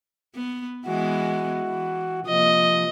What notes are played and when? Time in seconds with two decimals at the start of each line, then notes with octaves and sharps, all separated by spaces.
0.34 B3
0.86 E3 G#3 B3 F#4
1.62 E3
2.27 C3 F3 A#3 D#5